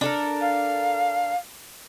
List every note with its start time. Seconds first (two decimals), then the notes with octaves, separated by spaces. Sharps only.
0.01 D4 A4 A#4
0.41 F5